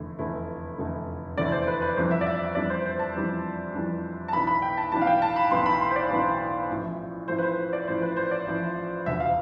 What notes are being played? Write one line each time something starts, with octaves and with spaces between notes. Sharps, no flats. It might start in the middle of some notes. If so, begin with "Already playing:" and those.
Already playing: F1 E2 D3 A3 E4
F1 E2 D3 A3 E4
F1 E2 D3 A3 E4
F1 E2 D3 A3 E4 D5
C5
B4
B4
F2 E3 G3 D4 C5
E5
D5
E5
E5
F2 E3 G3 D4 D5
C5
C5
A5
F2 E3 G3 D4
F2 E3 G3 D4
A5
B1 A2 E3 B3 D4 B5
B5
G5
A5
B1 A2 E3 B3 D4 A5
F5
G5
A5
B5
B1 A2 E3 B3 D4 C6
B5
C6
C5
D5
B1 A2 E3 B3 D4
A1 A2 F3
A1 A2 F3 C5
B4
C5
C5
D5
A1 A2 F3 C5
B4
C5
D5
A1 A2 F3
E1 D2 D3 E5
F5